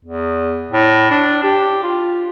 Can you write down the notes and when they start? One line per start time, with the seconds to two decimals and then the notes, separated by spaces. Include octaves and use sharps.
0.05 E2
0.72 A2
1.11 D4
1.43 G4
1.83 F4